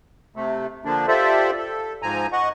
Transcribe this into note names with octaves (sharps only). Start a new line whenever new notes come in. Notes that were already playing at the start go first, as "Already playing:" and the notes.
C3 A3
D3 F3 A#3 D4
F4 G4 A4 C5 D5 E5
A4
G#2 F3 C4 G#5 A#5
D#5 F#5 C#6